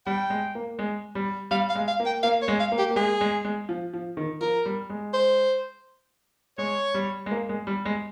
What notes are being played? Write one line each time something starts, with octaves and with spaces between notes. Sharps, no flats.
G3 G5
G#3
A#3
G#3
G3
G3 F5
F5
G#3
F5
A#3
G5
A#3 F5
C#5
G#3
F5
A#3
G4
A#3
G#3 G#4
G#3
G#3
F3
F3
D#3
F3 A#4
G3
G#3
C5
G#3 C#5
G3
G#3
A#3
G#3
G3
G#3